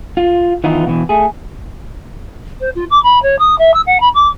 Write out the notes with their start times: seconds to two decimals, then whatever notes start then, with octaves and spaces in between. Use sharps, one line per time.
0.17 F4
0.64 D#3 E3 B3 D#4 F4
0.86 B2 E3
1.09 A3 G#4
2.60 C5
2.75 F4
2.90 D6
3.03 B5
3.22 C#5
3.39 D#6
3.58 E5
3.74 E6
3.86 F#5
4.00 B5
4.14 D6